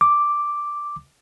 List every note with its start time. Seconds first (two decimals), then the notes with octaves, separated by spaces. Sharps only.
0.01 D6